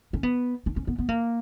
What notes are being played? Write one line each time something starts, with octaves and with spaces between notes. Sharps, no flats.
C#4
B3
D4
C#4
B3
B3
A#3